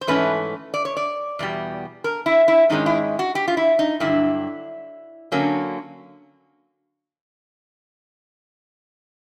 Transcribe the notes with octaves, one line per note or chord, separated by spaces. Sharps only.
C5
G#2 E3 A3 C#4 B4
D5
C#5
D5
E2 B2 G3
A#4
E4
E4
G#2 D#3 G#3 C#4 D#4
E4
F#4
G4
F4
E4
D#4
G2 D3 F#3 E4
D3 F#3 A#3 C#4